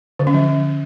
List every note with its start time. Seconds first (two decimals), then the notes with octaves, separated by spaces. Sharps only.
0.19 D3
0.27 C#4
0.34 F3